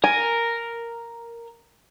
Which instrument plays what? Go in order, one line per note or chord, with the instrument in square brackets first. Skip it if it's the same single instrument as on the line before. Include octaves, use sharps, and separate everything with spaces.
[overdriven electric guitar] A#4 [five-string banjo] G#5